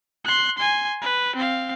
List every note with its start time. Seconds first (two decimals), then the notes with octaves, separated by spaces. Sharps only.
0.25 C6 F#6
0.58 G#5 C6
1.02 B4
1.35 C4 F5